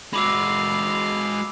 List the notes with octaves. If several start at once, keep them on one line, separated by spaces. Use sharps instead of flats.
G#3 F#4 F5 B5 D6 E6